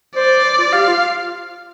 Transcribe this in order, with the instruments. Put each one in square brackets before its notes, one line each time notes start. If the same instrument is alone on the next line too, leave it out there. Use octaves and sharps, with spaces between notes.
[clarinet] C5 [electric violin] D5
[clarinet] C5
F4
[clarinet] G4 [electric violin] F5
[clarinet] F4